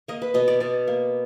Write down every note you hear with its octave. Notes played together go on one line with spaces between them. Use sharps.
A#3 D#5
B4
B2 D#5
D5
B2 D5
A#3